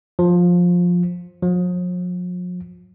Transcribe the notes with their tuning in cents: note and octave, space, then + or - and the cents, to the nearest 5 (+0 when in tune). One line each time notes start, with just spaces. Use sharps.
F3 +15
F3 +45